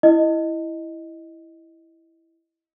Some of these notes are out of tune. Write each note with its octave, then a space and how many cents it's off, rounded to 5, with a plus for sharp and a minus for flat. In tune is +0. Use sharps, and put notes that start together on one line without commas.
E4 +0 D#5 +0